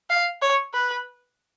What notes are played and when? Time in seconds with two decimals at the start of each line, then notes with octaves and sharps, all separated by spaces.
0.10 F5
0.42 C#5
0.74 B4